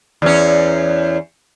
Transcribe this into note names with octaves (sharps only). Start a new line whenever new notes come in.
E2 C#4